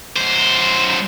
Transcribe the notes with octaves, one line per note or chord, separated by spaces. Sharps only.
F#2 C5